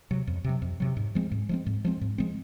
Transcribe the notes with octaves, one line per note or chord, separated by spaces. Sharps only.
C3 F#3
F2
C3 F#3
F2
C3 F#3
G#2
F3 G#3 C4
G#2
F3 G#3 C4
G#2
F3 G#3 C4
G#2
F3 G#3 C4